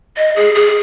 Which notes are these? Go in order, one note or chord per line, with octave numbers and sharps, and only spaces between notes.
D#5
G#4
G#4